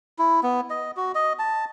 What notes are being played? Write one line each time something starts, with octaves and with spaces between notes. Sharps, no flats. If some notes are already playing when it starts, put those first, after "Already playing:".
E4
B3
D#5
F#4
D#5
A5